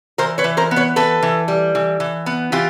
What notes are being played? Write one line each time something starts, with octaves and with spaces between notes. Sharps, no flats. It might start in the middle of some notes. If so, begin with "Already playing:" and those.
E3 A#4 C5
B4 C#5
E3
A#4 C5
B3
B4 C#5
E3 A4 B4
E3
G3
E3
E3
B3
E3 F4 G4